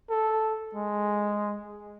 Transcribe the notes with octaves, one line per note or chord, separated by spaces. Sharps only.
A4
G#3